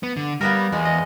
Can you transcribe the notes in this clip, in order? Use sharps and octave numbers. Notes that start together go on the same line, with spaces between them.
B3
D3
G3 A#3 B3 A#4
E2 G#3
D#5